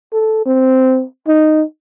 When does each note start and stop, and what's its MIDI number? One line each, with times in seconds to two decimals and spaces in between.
0.13 0.44 69
0.46 1.04 60
1.28 1.63 63